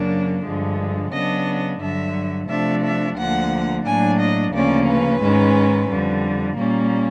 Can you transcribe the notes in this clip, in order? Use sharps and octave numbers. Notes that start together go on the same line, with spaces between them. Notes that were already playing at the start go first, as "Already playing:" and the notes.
Already playing: F#2 C#3 F#3 A#3 D4
G2 D3 F3 G#3
C#3 F#3 B3 D4 D#5
G2 D3 F#3 E5
C3 F3 A3 D4 E5
E5
D2 D3 F3 A#3 F#5
A2 F#3 A#3 D4 G#5
D#5
D2 C#3 F3 A#3 C#4 D5
B4
G#2 D#3 G#3 C#4
F2 D3 G3
A#2 G3 A#3 C#4